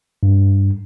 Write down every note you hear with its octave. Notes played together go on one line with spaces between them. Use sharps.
G2